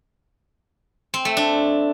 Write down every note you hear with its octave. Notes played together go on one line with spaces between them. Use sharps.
C4
A3
D4